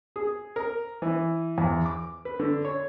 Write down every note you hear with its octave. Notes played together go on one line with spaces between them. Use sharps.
G#4
A#4
E3
E2
D6
B4
D3
C#5